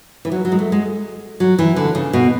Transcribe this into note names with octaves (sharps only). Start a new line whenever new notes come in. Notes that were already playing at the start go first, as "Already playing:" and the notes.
E3
F#3
F#3
G#3
A3
G#3
F#3
E3
D3
C#3
B2